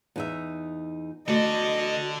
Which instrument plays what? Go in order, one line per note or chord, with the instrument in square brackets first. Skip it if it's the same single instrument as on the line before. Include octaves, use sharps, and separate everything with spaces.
[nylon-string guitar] E2 D#4 E5
[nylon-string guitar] A3 [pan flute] F#4 [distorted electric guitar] A4 D5 [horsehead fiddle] D#5